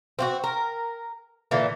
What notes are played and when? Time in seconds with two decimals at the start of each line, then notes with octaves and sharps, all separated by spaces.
0.19 C4 F4 F#4
0.44 A#4
1.51 A#2 D3 E3